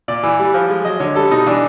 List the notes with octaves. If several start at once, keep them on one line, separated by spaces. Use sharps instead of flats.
A#2 D5
E3
G3
F3
G#3
F#3 D#5
D3 C#5
G3 A4
B2 D#4
E3 D4